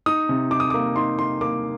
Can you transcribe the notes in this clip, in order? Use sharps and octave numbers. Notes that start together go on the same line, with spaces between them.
D#4 D#6
C3
D#4 D6
D#6
A#3 D6
D#4 C6
D#4 C6
A#3 D6